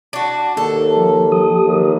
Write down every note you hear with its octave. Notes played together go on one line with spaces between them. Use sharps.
D4 F#4
D#2 A4
F3
F3 G4 D#6
D#2